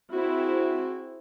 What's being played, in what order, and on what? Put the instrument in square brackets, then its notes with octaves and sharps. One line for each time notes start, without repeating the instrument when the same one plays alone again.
[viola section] C4 E4 G#4 [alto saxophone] F#4